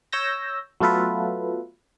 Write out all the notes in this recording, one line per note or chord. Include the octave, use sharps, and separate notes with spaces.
C#5 E6 G6 A#6
F#3 A3 B3 F4 A4 B4